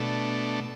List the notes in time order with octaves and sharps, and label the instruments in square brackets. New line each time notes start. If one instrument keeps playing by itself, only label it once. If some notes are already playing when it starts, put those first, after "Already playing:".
Already playing: [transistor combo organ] B2 A3 D4